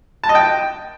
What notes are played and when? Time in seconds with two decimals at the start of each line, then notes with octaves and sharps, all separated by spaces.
0.24 A5
0.29 D#5
0.35 G5